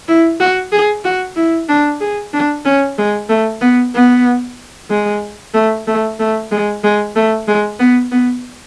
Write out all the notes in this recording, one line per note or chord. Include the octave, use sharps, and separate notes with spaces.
E4
F#4
G#4
F#4
E4
D4
G#4
D4
C#4
G#3
A3
B3
B3
G#3
A3
A3
A3
G#3
G#3
A3
G#3
B3
B3